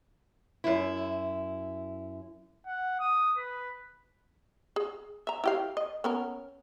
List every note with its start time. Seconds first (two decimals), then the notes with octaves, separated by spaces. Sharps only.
0.64 F#2 E4
2.67 F#5
3.00 D#6
3.37 B4
4.76 G#4
5.27 E5 A#5
5.44 E4 G4 F5
5.77 D#5
6.04 B3 C#4 A#4